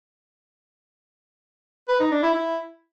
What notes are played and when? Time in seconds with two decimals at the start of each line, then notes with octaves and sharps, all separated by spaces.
1.89 B4
2.00 D#4
2.12 D4
2.23 E4
2.34 E4